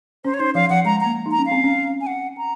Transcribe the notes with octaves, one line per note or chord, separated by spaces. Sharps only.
C#4 C5
C#5
D#4 C5
F3 F5
F3 F#5
G#3 A#5
A#3 A#5
D#4
A#5
C#4
F5
C4
C#4
G#5
F#5
A#5